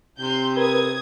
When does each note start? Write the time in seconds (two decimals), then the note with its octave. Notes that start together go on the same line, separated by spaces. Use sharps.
0.20 C3 C6 G6
0.57 A#4 B4 D#6 G#6